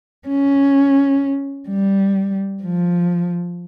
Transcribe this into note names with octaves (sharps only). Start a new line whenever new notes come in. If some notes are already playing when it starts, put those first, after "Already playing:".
C#4
G3
F3